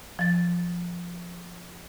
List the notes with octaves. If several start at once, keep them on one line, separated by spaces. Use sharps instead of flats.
F3 A6